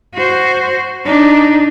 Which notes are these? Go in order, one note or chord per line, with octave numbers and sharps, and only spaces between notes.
F#4 C5
D4 D#4